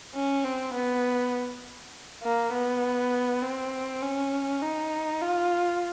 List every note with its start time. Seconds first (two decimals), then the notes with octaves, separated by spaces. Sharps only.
0.14 C#4
0.44 C4
0.74 B3
2.23 A#3
2.53 B3
3.43 C4
4.02 C#4
4.62 D#4
5.21 F4